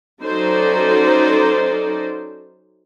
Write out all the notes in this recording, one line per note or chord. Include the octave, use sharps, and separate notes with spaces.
F#3 C#4 D#4 A4 C5 D5